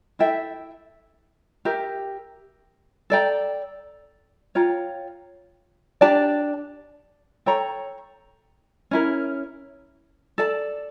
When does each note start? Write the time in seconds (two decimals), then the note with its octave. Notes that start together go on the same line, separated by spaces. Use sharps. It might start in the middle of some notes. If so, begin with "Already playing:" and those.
0.19 E4 A4 E5 G5
1.65 G4 A#4 E5
3.10 A4 D5 G5 A#5
4.55 F4 C#5 G5 A#5
6.01 D4 G4 D5 A5
7.46 A4 C#5 G5 A#5
8.91 C#4 E4 A#4
10.38 A4 D5 A5